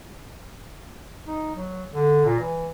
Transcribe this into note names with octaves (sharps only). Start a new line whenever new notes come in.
D#4
F#3
D3
A#2
E3